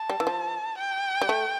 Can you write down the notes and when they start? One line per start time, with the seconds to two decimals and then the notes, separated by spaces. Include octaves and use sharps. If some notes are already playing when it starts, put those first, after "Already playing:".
Already playing: A5
0.10 G3
0.20 E3
0.27 F3
0.78 G5
1.21 G3
1.29 A3